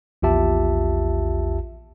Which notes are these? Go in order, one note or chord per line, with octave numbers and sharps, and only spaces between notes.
A#1 E2 F4 G4 E5 A5